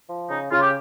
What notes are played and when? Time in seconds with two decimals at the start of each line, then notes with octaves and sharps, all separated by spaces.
0.09 F3
0.30 C#3 D#4
0.51 C#3 F4
0.61 G4